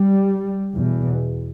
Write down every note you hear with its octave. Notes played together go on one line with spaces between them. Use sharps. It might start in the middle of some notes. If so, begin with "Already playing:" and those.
Already playing: G3
E2 B2